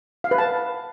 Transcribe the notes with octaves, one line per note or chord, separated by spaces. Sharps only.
F5
B4
A5